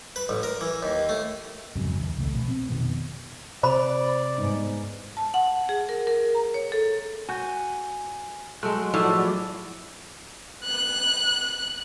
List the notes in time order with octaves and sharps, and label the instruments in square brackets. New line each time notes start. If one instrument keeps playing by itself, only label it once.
[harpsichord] B4
A1
A#4
E3
D#2
A3
[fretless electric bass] F2 G#2 C#3 F#3
D#2
C2 C#3 A3
A#1 B2
C4
F1 B2 D#3 B3
[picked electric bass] C3 [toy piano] C5 B5 [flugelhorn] D5
[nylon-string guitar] G#2 B3 D#4
[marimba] A5
F#5
G#4
A#4
A#4
A#5
C#5
A4
[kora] F#4 [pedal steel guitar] G#5 G6
[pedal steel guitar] F#3 C6 F#6 [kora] G#3 A3
[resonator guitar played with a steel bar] A2 [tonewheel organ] F3 F#4 D5 [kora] A3
[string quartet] F#6